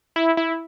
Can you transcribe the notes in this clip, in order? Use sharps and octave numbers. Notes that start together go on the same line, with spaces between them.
E4
E4